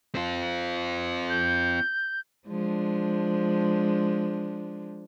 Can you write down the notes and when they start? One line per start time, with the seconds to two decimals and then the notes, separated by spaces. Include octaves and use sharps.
0.15 C4 F4
1.29 G6
2.48 F3 G#3 D4